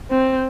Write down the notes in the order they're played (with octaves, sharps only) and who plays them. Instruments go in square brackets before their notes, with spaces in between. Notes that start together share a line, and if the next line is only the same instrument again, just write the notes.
[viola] C4